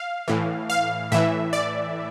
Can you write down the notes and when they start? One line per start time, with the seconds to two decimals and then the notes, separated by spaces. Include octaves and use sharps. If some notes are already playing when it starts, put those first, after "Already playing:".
Already playing: F5
0.28 A2 E3
0.70 F5
1.12 A2 E3 E5
1.53 D5